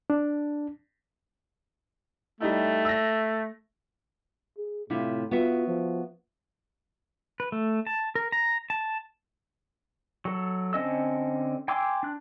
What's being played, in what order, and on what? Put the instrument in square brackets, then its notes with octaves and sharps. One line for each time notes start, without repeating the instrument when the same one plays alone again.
[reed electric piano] D4
[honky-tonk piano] G3 D#4 E4 [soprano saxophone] A3
[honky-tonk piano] E6 A#6
[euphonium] G#4
[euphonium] A2 [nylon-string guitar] C3 E4 F4
[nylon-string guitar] B3 F#4 E5 [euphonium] F4
[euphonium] F3
[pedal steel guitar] B4
A3
A5
A#4
A#5
A5
F#3 A4
D3 C4 C#4 D#5 E6
G5 G#5 C6 D6 E6
D4 F#6